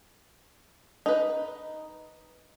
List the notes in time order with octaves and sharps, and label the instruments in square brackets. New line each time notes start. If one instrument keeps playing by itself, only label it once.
[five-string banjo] D#4 B4